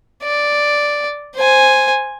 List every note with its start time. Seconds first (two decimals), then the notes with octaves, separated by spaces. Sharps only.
0.23 D5
1.36 C5 G#5